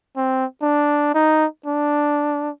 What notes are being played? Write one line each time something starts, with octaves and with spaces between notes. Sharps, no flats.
C4
D4
D#4
D4